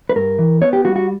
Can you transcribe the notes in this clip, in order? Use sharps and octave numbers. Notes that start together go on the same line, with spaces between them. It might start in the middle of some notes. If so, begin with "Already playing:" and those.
B4
G2 A#4
E3
B3 C#5
G4
G3 F#4
F#4